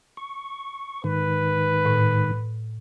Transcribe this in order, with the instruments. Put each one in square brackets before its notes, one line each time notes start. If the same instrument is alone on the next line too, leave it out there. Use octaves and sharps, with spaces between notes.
[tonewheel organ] C#6
[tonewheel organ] G#2 D#3 [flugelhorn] B4
[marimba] A2